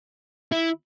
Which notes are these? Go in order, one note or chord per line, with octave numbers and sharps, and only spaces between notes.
E4